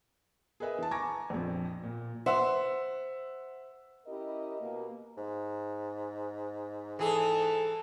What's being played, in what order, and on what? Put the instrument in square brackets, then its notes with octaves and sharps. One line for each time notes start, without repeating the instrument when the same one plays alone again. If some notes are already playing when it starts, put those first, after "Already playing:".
[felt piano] G#4 A#4 B4 D#5 E5
E3 A5
G#5 A#5 C#6 D6 G#6 A#6
A#1 F2
A#2
[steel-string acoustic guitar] C5 [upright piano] E5 F#5 E6
[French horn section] C#4 E4 G4 A#4 D#5
B2 A#3 B3
[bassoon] G#2
[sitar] E3 G#4 [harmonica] A4